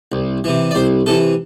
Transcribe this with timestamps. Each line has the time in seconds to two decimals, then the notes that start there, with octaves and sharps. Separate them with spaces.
0.12 C2
0.44 C3 E3
0.71 D5
0.75 C2 C5
1.06 C3 E3 A4